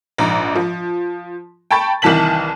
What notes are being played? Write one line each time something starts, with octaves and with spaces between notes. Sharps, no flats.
A#1 G#2 A#5
F3
G5 A5 B5 C#6 A6
C2 D#3 E3 A5 B6 F#7